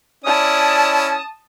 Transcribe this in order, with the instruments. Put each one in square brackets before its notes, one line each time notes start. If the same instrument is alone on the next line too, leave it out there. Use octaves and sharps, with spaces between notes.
[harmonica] C#4 E4 D5 [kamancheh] A5 D#6